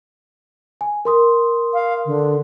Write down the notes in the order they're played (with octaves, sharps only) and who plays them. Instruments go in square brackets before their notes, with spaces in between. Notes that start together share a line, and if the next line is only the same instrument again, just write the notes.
[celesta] G#5
A#4 C6 D#6
[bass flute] F5
D3